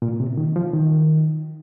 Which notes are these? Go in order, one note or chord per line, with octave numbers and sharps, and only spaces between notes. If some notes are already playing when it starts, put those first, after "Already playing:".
A#2
C3
D#3
F3
D#3